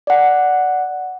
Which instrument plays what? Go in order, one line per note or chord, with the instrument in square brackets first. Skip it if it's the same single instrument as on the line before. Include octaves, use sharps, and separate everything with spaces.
[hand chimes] D5 F#5